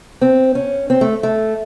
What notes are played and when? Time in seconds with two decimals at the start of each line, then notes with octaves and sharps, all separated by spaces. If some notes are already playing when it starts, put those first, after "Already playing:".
0.21 C4
0.55 C#4
0.90 C4
1.01 A3
1.23 A3